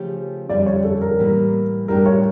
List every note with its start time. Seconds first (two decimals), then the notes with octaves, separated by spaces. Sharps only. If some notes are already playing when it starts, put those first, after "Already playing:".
Already playing: C#3 F3 A3 C#4 G4
0.49 F2 D3 G3 C#4 D5
0.66 C#5
0.84 A4
1.01 A#4
1.18 A2 E3 G3 A#3
1.88 A2 G3 D4 G4 A#4
2.06 C#5